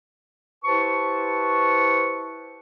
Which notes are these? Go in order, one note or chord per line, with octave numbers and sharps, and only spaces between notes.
E4 G4 B4 C5 A5 C#6